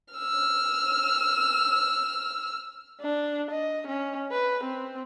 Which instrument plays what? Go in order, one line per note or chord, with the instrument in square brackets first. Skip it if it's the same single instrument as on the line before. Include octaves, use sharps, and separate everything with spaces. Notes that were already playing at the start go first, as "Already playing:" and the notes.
[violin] E6 F6
[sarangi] D4
D#5
C#4
B4
C4